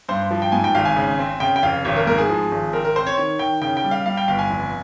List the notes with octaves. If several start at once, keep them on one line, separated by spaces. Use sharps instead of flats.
G2 C5
F3
G5
G#2 G#5
G5
G#1 F5
G#5
C#3
C4
C#3 G5
G5
F1 F5
G#1 C#5
A#4
G#2 A#4
G#4
F3
G#1
C4 A#4
A#4
C4 C5
C#5
D#3 C#5
D#3 G5
C#3 G5
G5
G3
F5
G3 F5
G5
G1 F5
G#5
F1